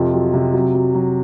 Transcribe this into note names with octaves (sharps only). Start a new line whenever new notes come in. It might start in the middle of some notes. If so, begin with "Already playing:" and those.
Already playing: F2 C3 F4
F#3
C3
F#3
F#3
F#3